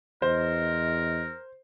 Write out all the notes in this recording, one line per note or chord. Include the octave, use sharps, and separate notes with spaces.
E2 A#4 C5 D#5